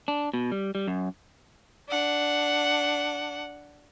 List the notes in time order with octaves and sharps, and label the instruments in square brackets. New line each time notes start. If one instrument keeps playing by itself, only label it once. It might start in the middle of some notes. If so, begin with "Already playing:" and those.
[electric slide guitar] D4
B2
G3
G3
F#2
[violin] D4 F#5